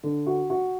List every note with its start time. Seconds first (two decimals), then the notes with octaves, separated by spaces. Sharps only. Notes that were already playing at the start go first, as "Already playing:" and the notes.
0.03 D3
0.27 F#4
0.50 F#4